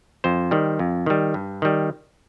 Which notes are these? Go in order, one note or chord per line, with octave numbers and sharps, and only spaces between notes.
F2 C5
D#3 G3
F2
D#3 G3
G2
D#3 G3